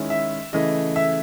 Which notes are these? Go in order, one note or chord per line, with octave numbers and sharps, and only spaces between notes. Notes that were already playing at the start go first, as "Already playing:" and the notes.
Already playing: D#3 G#3 C#4 E4
E5
C#3 E3 A3 D#5
E5